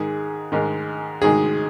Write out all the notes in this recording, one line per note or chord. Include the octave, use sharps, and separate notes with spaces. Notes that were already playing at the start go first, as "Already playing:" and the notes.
Already playing: G#2 D#3 G#3 G#4
G#2 D#3 G#3
G#2 D#3 G#3 G#4